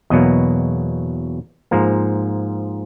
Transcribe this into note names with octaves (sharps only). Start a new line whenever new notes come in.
E2 B2 F#3 A#3 D#5
G#2 F3 A#3